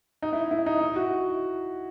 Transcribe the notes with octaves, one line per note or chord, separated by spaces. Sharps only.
D#4
E4
E4
D#4
E4
F#4